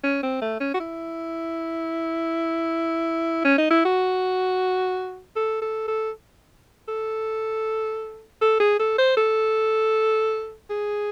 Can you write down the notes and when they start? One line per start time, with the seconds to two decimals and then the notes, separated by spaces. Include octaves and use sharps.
0.04 C#4
0.23 C4
0.42 A3
0.60 C#4
0.74 F#4
0.80 E4
3.45 C#4
3.58 D#4
3.71 E4
3.85 F#4
5.36 A4
5.62 A4
5.88 A4
6.88 A4
8.42 A4
8.60 G#4
8.80 A4
8.98 C5
9.17 A4
10.70 G#4